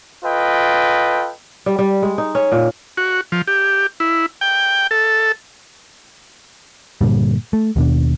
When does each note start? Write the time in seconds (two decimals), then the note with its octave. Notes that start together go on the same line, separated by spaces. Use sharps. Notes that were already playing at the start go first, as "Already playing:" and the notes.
0.24 F4 A4 B4 D#5 G5
1.66 G3
1.79 G3
2.02 G#3
2.18 D#4
2.35 C#4
2.52 A#2
2.97 F#4
3.32 F3
3.47 G4
4.00 E4
4.41 G5
4.91 A4
7.01 G2 A#2 D3 G3
7.53 A3
7.76 D#2 B2 D4